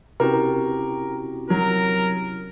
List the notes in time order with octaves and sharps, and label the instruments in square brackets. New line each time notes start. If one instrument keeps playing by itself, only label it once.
[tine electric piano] C3 C#4 E4 [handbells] C4 F#4 G4 [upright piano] A#4
[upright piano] F#3 [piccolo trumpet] A#4